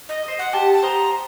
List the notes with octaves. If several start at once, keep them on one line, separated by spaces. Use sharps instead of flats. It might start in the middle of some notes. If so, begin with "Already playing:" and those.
D#5
C5 D#5
F#5
G4 A5
A5
C5 D#5 A#5